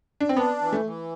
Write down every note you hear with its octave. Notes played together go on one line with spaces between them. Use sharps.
D4
C4
B3 D4
E3
A3
E3